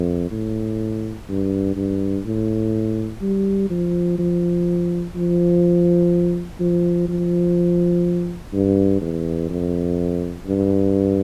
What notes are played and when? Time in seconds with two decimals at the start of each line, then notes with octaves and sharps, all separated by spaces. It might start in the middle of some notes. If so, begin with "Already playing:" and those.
Already playing: F2
0.31 A2
1.29 G2
1.76 G2
2.25 A2
3.21 G3
3.70 F3
4.18 F3
5.15 F3
6.60 F3
7.08 F3
8.53 G2
9.01 E2
9.49 F2
10.46 G2